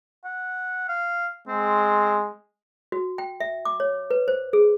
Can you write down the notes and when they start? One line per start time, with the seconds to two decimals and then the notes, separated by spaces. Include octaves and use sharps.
0.25 F#5
0.88 F5
1.48 G#3 C4
2.92 F#4
3.18 G5
3.40 E5
3.65 D6
3.80 C#5
4.11 B4
4.28 C5
4.53 G#4